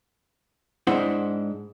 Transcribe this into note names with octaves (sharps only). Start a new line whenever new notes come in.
G#2 D4 E4 C5 F#5 C6